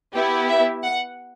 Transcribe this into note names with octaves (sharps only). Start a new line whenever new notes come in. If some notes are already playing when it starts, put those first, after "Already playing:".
B3 E4 G4
E5
F#5